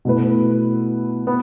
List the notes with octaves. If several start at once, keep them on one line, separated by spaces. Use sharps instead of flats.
B2 A3 E4 B4
B3